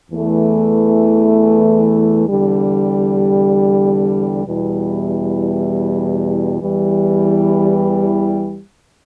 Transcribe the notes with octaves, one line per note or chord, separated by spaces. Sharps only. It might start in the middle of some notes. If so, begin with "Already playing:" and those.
E2 E3 A3
E2 D3 G3
E2 B2 G3 E4
E2 E3 G3